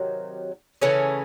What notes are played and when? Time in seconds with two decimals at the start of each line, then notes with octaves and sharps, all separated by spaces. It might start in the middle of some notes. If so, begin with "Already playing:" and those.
Already playing: C3 D#3 F#3
0.82 C#3 E3 A3 C#4